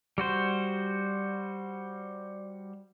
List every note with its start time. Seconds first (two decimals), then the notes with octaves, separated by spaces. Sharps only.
0.18 G3 F#4 C5